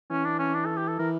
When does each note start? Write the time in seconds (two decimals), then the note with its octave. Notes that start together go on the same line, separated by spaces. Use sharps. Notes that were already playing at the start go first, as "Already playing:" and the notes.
0.10 E3 C#4
0.25 D4
0.39 C#4
0.54 D4
0.66 A4
0.77 G4
0.88 A4
0.99 E3 A#4